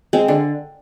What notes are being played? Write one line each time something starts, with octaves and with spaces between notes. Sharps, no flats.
G#3 C4
D3